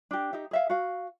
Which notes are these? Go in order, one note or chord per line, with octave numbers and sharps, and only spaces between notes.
D4 G4
D#4 G4 E5
G#4 E5 F5
F#4 F5